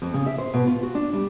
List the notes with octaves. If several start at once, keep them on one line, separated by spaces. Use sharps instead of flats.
F2
C#3
E5
C5
B2
F4
F#4
D4
G3